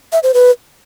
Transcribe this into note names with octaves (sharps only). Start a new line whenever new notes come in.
E5
C5
B4